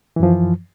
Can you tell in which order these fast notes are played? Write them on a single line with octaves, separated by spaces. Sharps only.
E3 F#2 F3